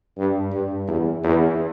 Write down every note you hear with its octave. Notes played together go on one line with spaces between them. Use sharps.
G2
G2
E2
E2